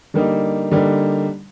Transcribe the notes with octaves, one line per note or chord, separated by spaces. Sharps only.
D3 G3 A#3 D#4
D3 G3 A#3 D#4